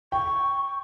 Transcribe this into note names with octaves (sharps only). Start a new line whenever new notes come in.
G5 C#6